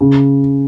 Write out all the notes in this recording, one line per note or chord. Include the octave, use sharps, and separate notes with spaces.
C#3